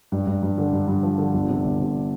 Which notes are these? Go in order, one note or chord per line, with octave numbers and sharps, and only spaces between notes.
G2
G2
G2
D3
G2
G2
F3
D3
G1
C3
G1
C3